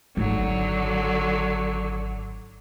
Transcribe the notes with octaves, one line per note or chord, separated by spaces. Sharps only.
G#1 D3 F#3